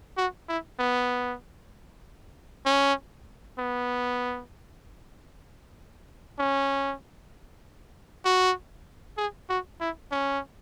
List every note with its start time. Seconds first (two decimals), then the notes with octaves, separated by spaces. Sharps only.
0.18 F#4
0.49 E4
0.79 B3
2.66 C#4
3.59 B3
6.39 C#4
8.25 F#4
9.17 G#4
9.50 F#4
9.81 E4
10.12 C#4